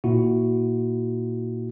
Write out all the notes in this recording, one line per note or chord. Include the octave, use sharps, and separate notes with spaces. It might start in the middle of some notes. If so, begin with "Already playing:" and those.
A#2 E4 F#4